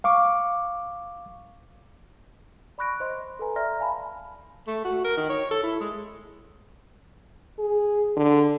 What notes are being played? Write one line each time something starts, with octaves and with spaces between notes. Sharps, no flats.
F5 C#6 D6
D5 B5 C#6 F#6 A#6 D7
C5 D#5 C6
A4 B4 G#5 A#5
D5 E5 A#5 C6 F6 A#6
F5 G#5 A5 B5
A3
F#4
A#4
D#3
C#5
A4
E4
G#3
G#4
D3